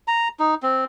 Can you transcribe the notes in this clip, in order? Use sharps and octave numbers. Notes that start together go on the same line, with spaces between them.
A#5
D#4
C4